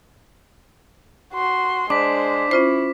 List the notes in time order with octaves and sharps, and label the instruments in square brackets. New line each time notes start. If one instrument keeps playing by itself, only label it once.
[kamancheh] F#4 C6
[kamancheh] G#3 C5 [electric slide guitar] D4 [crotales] D6 B6
[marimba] C#4 F4 C5 [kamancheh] E4